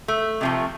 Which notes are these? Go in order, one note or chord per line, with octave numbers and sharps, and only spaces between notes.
A3
C3 F3 A3